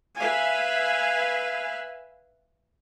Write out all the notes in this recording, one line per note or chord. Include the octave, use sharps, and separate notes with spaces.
B4 E5 F5 G#5